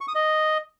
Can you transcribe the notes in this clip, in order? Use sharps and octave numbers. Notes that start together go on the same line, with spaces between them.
C#6
D#6
D#5